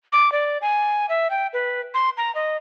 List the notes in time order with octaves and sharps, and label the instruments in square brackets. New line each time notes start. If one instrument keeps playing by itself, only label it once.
[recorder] D6
D5
G#5
E5
G5
B4
C6
A#5
D#5